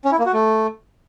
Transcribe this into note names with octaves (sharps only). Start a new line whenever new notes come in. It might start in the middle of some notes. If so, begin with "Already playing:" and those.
C#4
E4
A#3
F#4
A3